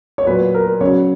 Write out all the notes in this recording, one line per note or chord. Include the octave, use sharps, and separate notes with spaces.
C#5
A#2 F#3 B4
A#4
C#3 F#3 C#5